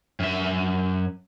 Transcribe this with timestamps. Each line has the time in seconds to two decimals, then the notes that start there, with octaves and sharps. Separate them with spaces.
0.20 F#2 E5